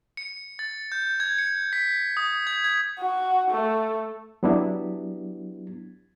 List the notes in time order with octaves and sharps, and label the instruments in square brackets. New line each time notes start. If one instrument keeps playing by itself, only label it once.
[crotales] C#7
A6
G6
G#6
C#7
B6
D#6
G#6
G#6
[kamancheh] F#4
A3
[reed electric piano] F#3 B3 D4 E4 G4